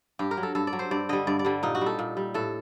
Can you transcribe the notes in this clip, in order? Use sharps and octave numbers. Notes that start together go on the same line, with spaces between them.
G2 G4
A#4
F#3
A4
G2 A4
D5
F#3
C5
G2 D5
D3 G3 D#5
G2 D5
D5
D3 G3
A#2 D#4
F#4
G3
A4
A#2
G3
A2 A4